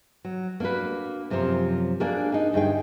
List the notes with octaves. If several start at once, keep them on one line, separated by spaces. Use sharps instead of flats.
F#3
A#3 D4 D#4 F#4 B4
F#2 C3 F3 A#4 C5 C#5
A#3 D4 F#4 G#4 A#4
D#4 G#4
D2 G2 D#4 G#4 G5